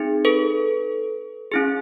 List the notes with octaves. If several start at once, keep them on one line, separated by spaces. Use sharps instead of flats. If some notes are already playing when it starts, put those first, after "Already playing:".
Already playing: C4 D#4 G#4
A4 B4
C#4 E4 G#4